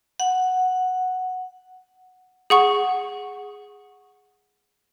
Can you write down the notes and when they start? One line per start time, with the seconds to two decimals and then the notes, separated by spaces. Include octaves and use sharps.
0.20 F#5
2.50 G#4 F#5 C#6